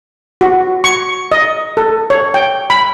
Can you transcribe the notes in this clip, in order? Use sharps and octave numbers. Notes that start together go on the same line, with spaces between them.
F#4
C#6
D#5
A4
C#5
G5
B5